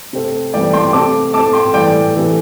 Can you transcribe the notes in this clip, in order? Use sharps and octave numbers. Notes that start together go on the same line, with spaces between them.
C3 A3 C4
A2 E3 G3 C4 D5 G5
G5 C6
C3 A3 C4 A5 D6
A2 A3 C4 A5 D6
G5 C6
A2 E3 G3 D5 G5
C3 E3 A3